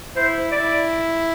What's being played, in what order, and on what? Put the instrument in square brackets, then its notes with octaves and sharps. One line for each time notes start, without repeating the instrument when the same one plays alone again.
[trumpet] E4 [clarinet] C5
[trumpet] E4 [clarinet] D5